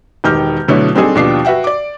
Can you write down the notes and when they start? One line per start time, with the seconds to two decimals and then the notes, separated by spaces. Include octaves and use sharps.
0.24 E1 D#3 G4 F6 G6
0.68 B2 D3 F#3 A3 E4
0.95 G3 C4 D4 D#4 G#4 A4
1.15 D#2 B2 F3 D4 G4 C7
1.45 F#4 B4 E5 F#5 G5
1.64 D5 D6